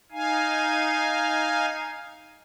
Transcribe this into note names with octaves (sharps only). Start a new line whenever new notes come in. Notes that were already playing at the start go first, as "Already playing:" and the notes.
D#4 F5 G#5